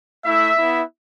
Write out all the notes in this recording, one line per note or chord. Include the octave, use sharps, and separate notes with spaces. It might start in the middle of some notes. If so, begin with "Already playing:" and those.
A3 E4 E5
B3 E4